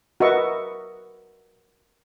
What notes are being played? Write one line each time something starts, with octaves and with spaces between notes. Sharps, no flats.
F#4 A#4 B4 D#5 E5 C#6